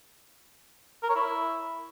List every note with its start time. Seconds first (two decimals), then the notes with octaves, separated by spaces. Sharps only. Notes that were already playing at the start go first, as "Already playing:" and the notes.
1.03 A#4
1.09 C#5
1.16 E4